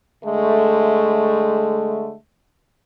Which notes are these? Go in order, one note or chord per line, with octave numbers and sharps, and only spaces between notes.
D3 G#3 A3